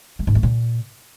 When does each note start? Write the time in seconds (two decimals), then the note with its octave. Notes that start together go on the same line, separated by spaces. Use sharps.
0.19 G#3
0.27 G#2
0.35 A3
0.43 A#2